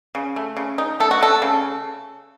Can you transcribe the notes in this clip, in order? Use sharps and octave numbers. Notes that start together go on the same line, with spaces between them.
C#3
A3
C#3
D#4
A3 A4
F#4
A3 A4
C#3